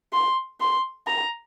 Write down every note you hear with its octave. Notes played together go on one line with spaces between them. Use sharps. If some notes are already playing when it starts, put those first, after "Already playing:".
C6
C6
A#5